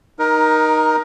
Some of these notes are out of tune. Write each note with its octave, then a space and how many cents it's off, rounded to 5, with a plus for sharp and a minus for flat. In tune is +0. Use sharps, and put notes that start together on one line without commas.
D#4 +0 A#4 +20